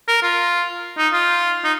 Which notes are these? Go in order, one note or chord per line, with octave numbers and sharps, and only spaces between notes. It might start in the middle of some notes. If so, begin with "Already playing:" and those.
A#4
F4
D#4
F4
D#4